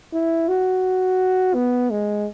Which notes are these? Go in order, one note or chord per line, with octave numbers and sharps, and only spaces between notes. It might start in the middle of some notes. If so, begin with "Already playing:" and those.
E4
F#4
B3
G#3